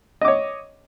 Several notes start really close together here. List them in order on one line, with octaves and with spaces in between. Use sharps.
D#5 D6 C#5